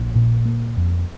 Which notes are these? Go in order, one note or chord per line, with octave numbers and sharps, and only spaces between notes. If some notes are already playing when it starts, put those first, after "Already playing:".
Already playing: A#1
A#2
A#3
F2